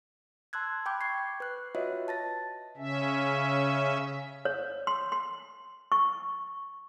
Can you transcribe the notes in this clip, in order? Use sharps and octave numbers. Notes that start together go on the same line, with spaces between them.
A5 C6 E6 F#6 G#6
G5 B5 D6 G6
C#6 G#6 C7
B4 F#6
F4 F#4 B4 C#5 D#5 E5
A5 A6 A#6
C#3 C#4 E5
C#5
C6
C6
C#6